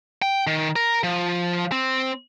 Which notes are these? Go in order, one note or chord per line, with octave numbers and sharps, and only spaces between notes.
G5
D#3
A#4
F3
C4